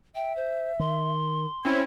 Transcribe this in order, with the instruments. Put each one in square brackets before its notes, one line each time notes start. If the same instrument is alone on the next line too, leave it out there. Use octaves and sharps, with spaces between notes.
[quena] E5 [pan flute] G5
[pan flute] C5
[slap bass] D#3 [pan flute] C6
[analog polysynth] C4 C#4 E4 [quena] G#6